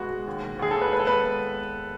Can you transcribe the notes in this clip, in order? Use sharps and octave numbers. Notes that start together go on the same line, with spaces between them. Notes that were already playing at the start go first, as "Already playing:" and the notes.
Already playing: B2 G#3 B3 F#4
G#3
D#2
D#2
D#2 G#4
A4
D#2 B4
G#3 B4
A4
B3 B4
G#3